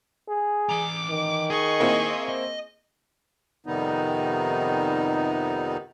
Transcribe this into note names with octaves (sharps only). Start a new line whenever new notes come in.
G#4
E3 A#5 D6
D#3
G#4 D#5 C#6
A#3 C4 E4
D#5
F2 C3 D#3 G3 B3 D#4